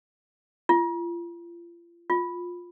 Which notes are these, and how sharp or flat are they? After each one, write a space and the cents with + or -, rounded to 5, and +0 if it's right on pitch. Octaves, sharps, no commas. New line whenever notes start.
F4 -35
F4 +15